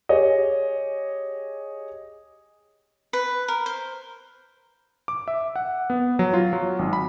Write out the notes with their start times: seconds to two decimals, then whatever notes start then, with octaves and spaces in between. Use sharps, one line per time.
0.09 G4 G#4 C#5 D#5
3.13 B4
3.48 A#4
3.66 C5
5.08 D6
5.28 E5
5.56 F#5
5.90 B3
6.19 F#3
6.33 F4
6.53 F#3
6.79 G#1
6.93 B5